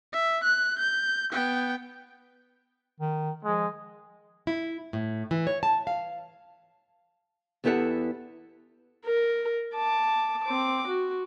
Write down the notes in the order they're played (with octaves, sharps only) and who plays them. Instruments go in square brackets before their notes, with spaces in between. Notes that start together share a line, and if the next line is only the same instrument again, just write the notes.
[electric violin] E5
F#6
G6
B3 G5
[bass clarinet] D#3
[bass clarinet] F3 [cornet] G#3
[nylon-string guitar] E4
A2
E3
C#5
A5
F5
E2 B3 E4 G4 A4 F#5
[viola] A#4
A5 D6
C4 D6
F#4